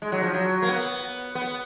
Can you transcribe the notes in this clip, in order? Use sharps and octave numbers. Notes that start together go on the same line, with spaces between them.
G#3
F#3
F3
F#3
A#3
B3
B3